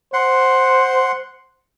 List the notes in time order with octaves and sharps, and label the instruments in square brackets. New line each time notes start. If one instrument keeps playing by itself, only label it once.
[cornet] C5 [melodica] F#5 C6